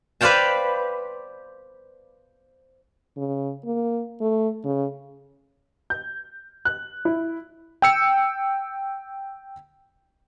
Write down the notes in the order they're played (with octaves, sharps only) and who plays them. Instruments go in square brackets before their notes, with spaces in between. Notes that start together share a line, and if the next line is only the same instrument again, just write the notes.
[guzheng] B4 C5 D5 F5 G5 A5
[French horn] C#3
A#3
A3
C#3
[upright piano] G6
F#6
E4
[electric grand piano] G5 E6 C#7